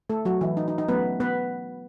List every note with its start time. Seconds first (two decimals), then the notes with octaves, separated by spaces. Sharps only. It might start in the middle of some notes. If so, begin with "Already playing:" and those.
0.10 A3 A4
0.25 F#3 F#4
0.41 E3 E4
0.57 D#4
0.68 D#4
0.78 D#4
0.88 F#3 A3 B3 C#4 B4
1.20 B3 B4